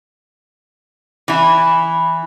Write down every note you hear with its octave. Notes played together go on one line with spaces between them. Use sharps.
E3 E4